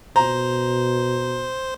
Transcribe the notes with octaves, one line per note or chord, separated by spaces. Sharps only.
B2 C5 A#5